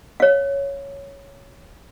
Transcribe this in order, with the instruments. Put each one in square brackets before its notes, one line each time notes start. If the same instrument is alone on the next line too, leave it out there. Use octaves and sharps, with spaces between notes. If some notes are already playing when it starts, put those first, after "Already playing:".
[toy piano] C#5 F5